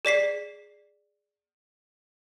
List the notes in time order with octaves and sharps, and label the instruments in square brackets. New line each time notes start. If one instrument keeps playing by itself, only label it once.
[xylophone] G#4 D5 B6 C7